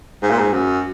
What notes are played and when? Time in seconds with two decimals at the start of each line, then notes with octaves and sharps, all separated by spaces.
0.22 G#2
0.31 A#2
0.39 G#2
0.53 F#2